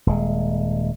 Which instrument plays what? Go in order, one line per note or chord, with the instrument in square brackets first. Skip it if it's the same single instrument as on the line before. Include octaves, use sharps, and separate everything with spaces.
[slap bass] D#1 G#3